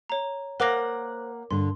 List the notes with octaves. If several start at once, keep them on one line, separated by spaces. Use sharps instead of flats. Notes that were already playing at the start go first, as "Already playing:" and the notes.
C#5 A#5
A#3 A#4 C5 F#5 D6 A#6
G2 D3 C6